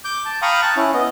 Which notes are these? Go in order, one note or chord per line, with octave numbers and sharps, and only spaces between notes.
D6 G6
A5
F5 G5 A#5 B5 C#6 D#6
A5 F#6
C#4 E4
B3 D#5